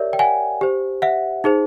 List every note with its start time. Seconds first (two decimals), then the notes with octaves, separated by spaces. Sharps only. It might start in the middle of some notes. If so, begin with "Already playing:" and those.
Already playing: G4 A#4 C#5 D5 E5
0.13 G5
0.19 F#5 G#5
0.61 G4 C5
1.02 E5 F#5
1.44 D#4 G#4 C5